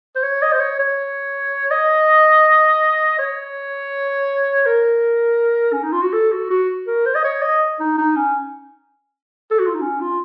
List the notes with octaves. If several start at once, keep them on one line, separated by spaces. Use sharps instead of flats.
C5
C#5
D#5
C5
C#5
C#5
D#5
C#5
A#4
C#4
D#4
F4
F#4
A4
F#4
F#4
A#4
C5
D#5
C#5
D#5
D#4
D#4
C#4
A4
F#4
F4
D#4
C#4
F4